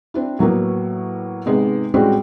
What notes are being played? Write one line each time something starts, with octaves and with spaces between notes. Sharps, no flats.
C4 D4 E4
A2 F#3 A#3 B3
G#2 C3 G#3 B3
A2 G3 G#3 C4 C#4 F#4